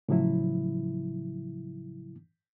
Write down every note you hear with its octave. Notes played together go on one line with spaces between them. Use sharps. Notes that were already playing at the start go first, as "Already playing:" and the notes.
A2 C#3 F3 F#3 E4